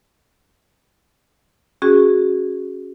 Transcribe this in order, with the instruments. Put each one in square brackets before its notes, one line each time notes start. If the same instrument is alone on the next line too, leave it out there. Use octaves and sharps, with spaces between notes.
[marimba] C#4 F#4 G#4